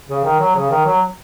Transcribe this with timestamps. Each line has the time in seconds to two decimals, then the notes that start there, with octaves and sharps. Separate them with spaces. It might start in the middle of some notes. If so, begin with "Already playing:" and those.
0.09 C#3
0.24 D#3
0.39 F#3
0.56 C#3
0.71 D#3
0.86 F#3